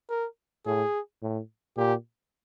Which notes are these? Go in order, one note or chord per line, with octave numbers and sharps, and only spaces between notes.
A#4
A2 G#4
A2
A#2 G4